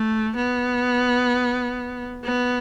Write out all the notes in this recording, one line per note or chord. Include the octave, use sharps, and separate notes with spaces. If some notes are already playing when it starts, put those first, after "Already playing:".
Already playing: A3
B3
B3